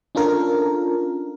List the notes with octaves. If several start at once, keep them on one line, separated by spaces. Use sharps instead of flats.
C#4 D4 F4 A4 A#4